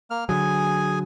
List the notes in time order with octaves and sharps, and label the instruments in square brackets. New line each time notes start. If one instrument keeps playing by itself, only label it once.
[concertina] A#3 F6
[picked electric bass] D3 F#3 [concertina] G#4 G#5